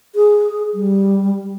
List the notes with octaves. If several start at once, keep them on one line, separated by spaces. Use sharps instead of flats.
G#4
G3